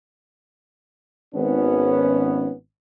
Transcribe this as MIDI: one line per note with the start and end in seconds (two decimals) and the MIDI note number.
1.35 2.51 32
1.35 2.51 59
1.35 2.51 61